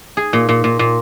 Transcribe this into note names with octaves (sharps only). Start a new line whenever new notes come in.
G#4
A#2
A#2
A#2
A#2